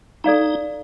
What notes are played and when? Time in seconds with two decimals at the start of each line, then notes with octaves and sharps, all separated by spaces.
0.24 D#4 A4 D5 F5 A#5